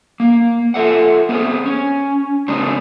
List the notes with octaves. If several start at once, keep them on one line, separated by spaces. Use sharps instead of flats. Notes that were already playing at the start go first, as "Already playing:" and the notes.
A#3
F4 A4 E5 F#5
B3 C4 G#4
C#4
C#3 G#3 C4 D4 D#4